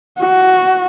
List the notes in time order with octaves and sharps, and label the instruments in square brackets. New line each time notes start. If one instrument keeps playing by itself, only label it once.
[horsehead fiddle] F#4